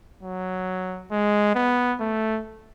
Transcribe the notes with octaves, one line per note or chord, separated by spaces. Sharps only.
F#3
G#3
B3
A3